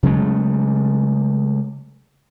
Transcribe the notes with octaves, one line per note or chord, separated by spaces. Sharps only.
C#3 F#3 G#3 A3